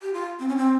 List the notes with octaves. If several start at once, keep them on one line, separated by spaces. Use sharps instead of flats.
G4
F4
C4
C#4
C4